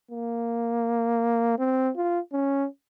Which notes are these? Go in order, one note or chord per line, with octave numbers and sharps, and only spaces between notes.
A#3
C4
F4
C#4